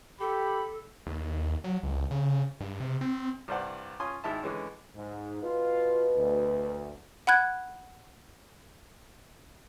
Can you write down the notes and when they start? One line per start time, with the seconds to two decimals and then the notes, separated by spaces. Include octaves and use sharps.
0.20 G4 A4 B5
1.07 D#2
1.64 F#3
1.83 C#2
2.11 C#3
2.60 G2
2.80 C3
3.01 C4
3.48 C2 G2 C5 D5 F#5
4.00 C#4 F4 G#5 C6 D#6
4.24 G#1 G#3 E4 E5 A5
4.43 D3 E3 G#3 C#4
4.96 G#2
5.43 B2 F4
6.16 D2
7.27 F#5 B5 F#6 G#6